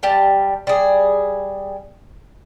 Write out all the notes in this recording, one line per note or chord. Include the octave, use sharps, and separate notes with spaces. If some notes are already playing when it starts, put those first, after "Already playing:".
G3 G4 A5
G3 G#4